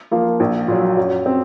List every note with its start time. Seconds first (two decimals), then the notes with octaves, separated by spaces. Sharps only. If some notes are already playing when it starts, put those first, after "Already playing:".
0.11 F3 A#3 F4
0.40 A#1
0.68 A#2 F#3
0.97 F#2
1.26 C4